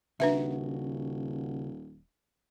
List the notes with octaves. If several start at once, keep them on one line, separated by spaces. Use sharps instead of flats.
D#1 C#3 D4 F#4 B4 E5